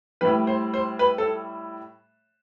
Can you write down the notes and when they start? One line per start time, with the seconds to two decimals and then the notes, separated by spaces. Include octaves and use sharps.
0.21 A2 G3 B4
0.47 C5
0.74 C5
0.99 B4
1.18 A4